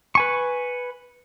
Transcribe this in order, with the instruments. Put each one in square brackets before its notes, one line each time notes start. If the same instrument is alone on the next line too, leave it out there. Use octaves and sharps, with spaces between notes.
[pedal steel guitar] B4 G#5 C#6